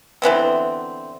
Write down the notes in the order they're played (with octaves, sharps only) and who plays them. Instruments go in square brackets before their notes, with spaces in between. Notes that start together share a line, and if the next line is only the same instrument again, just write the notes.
[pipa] D3 E3 B3 C4